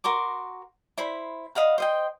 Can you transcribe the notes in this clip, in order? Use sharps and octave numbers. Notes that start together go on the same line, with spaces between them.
F#4 A#4 C6 D6
E4 C5 B5
D#5 F5 F#5 B5
C5 D#5 G5